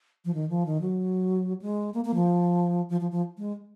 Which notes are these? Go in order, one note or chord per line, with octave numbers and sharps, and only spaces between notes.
F3
D#3
F3
D#3
F#3
G#3
A#3
A#3
F3
F3
F3
F3
G#3